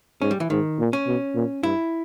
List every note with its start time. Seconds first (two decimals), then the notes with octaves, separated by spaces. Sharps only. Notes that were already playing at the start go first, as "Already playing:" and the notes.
0.21 G#2 C#4
0.31 G3
0.40 E3
0.50 G#2 D#3
0.79 A#2
0.93 C#4
1.07 B2
1.35 A#2
1.63 G2 E4